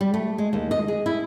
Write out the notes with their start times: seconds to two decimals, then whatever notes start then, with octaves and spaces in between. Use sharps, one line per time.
0.01 G3
0.14 A3
0.38 G#3
0.53 D#2
0.71 D#5
0.88 G#4
1.06 E4